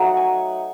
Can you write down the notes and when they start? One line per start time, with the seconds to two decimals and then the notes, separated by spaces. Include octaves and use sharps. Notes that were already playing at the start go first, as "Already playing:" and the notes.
Already playing: F#3 A3 D#4 F#5
0.17 G#5